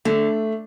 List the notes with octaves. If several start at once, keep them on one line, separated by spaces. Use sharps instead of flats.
D3 A3